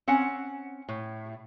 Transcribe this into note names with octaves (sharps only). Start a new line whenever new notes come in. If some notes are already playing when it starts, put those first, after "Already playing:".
C4 C#4 F#5
A2